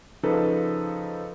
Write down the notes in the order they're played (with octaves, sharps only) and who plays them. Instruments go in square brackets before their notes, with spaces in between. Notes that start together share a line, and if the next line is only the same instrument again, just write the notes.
[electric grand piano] C#3 F3 D#4 A4 B4